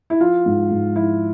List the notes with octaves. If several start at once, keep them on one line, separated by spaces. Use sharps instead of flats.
E4
F3 F4
G#2
G#2
F3 E4